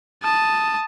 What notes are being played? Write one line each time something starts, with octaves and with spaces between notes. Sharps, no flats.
A5 D#6